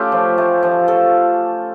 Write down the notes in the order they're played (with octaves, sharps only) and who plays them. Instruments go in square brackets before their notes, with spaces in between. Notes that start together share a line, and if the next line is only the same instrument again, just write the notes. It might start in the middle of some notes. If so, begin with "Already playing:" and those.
Already playing: [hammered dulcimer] A3 C#4 F4 G4 A4
F3
A3
F3
F3 A4